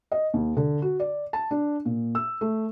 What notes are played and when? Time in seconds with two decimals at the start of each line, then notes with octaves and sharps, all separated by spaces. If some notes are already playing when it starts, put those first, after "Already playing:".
0.12 D#5
0.34 D#2
0.57 D3
0.82 F#4
1.00 D5
1.33 A5
1.51 D4
1.85 A#2
2.15 E6
2.41 A3